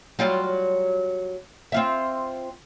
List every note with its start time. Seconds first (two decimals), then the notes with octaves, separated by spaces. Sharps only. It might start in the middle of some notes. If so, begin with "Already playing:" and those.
0.19 F#3 G3 F4
1.72 C4 F4 E5